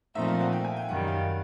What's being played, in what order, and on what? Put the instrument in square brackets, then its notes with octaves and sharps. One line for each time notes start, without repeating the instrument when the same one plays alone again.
[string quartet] A#2 F3 A3 C4 D#4 [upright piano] E5
[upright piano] F5
F#5
G5
G#5
G5
[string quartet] F#2 D#3 G3 [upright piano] F#5
[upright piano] F5